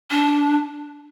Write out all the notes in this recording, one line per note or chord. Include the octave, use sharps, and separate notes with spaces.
D4